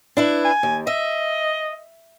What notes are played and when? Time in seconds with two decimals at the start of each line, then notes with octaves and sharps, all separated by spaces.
0.17 D4 E4 B4
0.45 G#5
0.63 D#2
0.87 D#5 E5